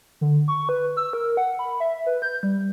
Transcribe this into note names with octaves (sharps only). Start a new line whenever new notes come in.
D3
C#6
B4
E6
A#4
F#5
B5
E5
B4
G6
G3